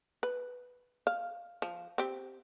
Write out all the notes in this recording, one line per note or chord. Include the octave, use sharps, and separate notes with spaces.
B4
F5
F3
C4 G4